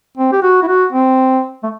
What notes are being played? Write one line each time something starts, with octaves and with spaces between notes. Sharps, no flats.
C4
G4
F#4
E4
F#4
C4
A3